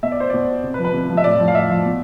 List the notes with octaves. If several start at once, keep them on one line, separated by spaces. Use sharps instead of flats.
B2 E5
D5
C5
B2 D5
C3
B4
F3
B4
C3
F3
E5
A2 D5
F3
F5
A2 E5
F3
B2